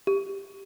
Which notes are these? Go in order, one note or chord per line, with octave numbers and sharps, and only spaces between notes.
G4